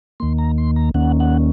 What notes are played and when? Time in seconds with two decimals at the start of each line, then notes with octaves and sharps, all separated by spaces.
0.20 D#2 D#3 A#3 C6
0.38 A#5
0.58 C6
0.76 A#5
0.94 D#2 D#3 A#3 C#4 F#5
1.20 F#5